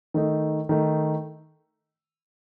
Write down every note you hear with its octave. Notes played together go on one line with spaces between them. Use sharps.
D#3 A3 D#4
D#3 A3 D#4